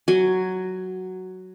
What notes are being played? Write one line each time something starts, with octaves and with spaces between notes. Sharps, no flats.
F#3 G#5